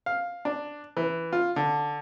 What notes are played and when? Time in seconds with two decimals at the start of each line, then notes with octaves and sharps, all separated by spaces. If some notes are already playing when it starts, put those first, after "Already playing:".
0.06 F5
0.45 D4
0.97 E3
1.33 F4
1.56 D3